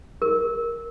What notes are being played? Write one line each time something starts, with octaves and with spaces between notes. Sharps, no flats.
A#4